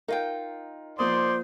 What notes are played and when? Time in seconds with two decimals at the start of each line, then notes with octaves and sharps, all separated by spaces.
0.08 D#4 F4 A#4 G5
0.99 F3 A#3 C5 D5 C6 D#6